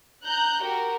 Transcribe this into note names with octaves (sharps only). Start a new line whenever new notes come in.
A#5 F#6 G6
F#4 G4 A#4